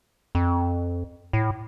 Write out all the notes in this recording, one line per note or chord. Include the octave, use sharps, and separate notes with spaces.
F2
A2